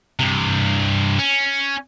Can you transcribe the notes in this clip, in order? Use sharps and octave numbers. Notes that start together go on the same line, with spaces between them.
G2 C3
C#4